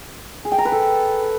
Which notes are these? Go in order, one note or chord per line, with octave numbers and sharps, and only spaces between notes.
G#4
G5
A#5
B4
A4